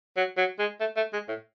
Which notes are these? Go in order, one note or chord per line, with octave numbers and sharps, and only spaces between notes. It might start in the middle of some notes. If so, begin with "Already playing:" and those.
F#3
F#3
G#3
A3
A3
G#3
A2